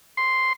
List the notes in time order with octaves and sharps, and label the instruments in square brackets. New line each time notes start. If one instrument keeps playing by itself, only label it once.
[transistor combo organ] C6